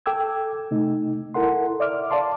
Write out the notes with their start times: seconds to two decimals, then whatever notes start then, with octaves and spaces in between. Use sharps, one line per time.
0.06 A4 G5 D6 E6 G#6
0.71 C3 A3 D#4
1.34 E4 A4 A#4 F#5 C6
1.80 D5 E5 D6 F6
2.10 D5 F5 A5 C6 D6